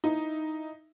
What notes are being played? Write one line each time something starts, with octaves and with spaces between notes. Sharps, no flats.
D#4 E4